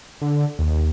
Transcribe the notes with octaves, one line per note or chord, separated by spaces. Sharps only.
D3
D#2